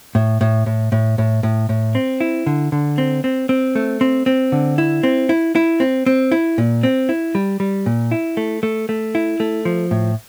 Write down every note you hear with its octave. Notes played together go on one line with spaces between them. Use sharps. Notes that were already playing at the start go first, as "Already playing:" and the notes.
A2
A2
A2
A2
A2
A2
A2
C4
E4
D3
D3
C4
C4
C4
A3
C4
C4
D3
E4
C4
E4
E4
C4
C4
E4
A#2
C4
E4
G3
G3
A#2
E4
A3
A3
A3
E4
A3
F3
A2